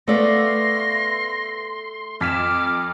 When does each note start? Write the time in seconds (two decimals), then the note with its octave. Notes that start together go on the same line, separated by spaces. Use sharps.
0.08 A3 B3 D5 E5 F5 C6 A#6
2.21 F2 D6 F6 B6 E7